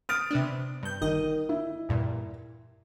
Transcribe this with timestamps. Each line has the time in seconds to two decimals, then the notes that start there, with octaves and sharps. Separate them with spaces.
0.09 D#6 F6 A6 D7
0.31 C3 B3 D4
0.83 G2 G6
1.01 G1 D#3 D#5
1.49 E4
1.89 E2 G2 A#2